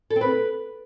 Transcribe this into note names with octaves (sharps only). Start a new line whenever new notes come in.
A4
C4
B4